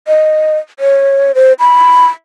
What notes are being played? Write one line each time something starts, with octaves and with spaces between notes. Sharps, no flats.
D#5
C#5
C5
B5